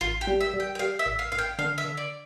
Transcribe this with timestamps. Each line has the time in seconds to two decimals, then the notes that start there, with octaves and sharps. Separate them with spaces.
0.01 A1 F4
0.21 G4
0.27 G3
0.40 E5
0.54 G3
0.60 G5
0.75 G5
0.79 G3 F5
0.99 E5
1.06 A1
1.19 F5
1.32 A1 F5
1.39 G5
1.59 D3 F5
1.78 E5
1.84 D3
1.97 D5